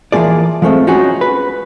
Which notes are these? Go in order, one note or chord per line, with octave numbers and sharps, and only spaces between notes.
E3 F3 A#3 G#4 D5
F3 G#3 A3 C4
C#4 D#4 F4 F#4 G#4
B4